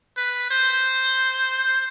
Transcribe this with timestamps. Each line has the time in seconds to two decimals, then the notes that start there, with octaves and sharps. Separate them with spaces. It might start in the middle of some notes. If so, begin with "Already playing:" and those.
0.17 B4
0.51 C5